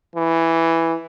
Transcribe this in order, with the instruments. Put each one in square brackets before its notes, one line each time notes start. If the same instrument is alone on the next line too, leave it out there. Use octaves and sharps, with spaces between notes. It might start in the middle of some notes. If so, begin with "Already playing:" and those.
[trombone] E3